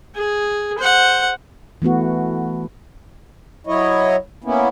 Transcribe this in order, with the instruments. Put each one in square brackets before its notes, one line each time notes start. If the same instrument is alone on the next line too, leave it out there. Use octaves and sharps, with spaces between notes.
[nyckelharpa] G#4
C5 F#5
[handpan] E3 A3 B3 F#4
[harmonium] F#3 E4 C#5 D#5
A#3 B3 C#4 E4